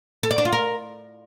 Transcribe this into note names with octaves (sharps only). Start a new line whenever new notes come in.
A4
D5
D4
F4
A#4